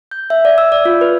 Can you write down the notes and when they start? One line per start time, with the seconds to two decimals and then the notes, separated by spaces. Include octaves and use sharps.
0.11 G6
0.30 E5
0.45 D5
0.58 E6
0.72 D5
0.85 F4
1.01 B4